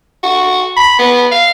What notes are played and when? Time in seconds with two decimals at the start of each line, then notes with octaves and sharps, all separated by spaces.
0.23 F#4
0.77 B5
0.99 B3
1.32 F5